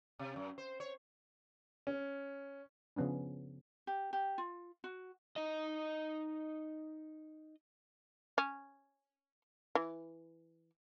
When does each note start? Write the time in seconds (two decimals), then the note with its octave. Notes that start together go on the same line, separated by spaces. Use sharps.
0.19 C3
0.36 F#2
0.58 C5
0.80 C#5
1.87 C#4
2.96 C#3 F3 B3 C#4 D4
3.87 G4
4.13 G4
4.38 F4
4.84 F#4
5.36 D#4 D#5
8.38 C#4
9.75 E3